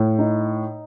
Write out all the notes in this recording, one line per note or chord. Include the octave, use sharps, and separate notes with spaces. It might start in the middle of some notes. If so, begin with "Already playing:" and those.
Already playing: A2
D#4